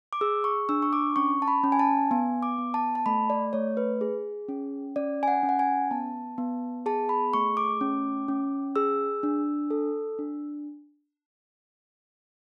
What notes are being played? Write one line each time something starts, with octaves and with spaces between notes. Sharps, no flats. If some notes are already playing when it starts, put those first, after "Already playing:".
D6
G#4 E6
C#6
D4 E6
C#6
D6
C#4 C#6
A5
B5
C#4
G#5
A5
B3 G#5
D6
B3
A5
A5
A3 B5
D5
A3 C#5
B4
G#4
C#4
C#4 D5
G#5
F#5
C#4
F#5
G#5
B3 A5
B3
G#4 A5
B5
A3 C#6
D6
C#4
C#4
G#4 E6
D4
A4
D4